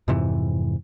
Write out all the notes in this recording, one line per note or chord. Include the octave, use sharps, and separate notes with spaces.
F2 G#2 C3 E3